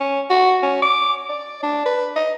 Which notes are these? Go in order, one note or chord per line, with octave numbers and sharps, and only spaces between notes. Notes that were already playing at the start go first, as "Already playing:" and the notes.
C#4
F#4
C#4
D6
D5
D4
B4
D#5